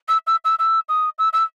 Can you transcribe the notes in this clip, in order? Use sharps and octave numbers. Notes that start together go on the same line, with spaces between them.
E6
E6
E6
E6
D#6
E6
E6